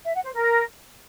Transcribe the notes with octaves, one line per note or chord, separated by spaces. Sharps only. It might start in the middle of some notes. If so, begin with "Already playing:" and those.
E5
F#5
C5
A#4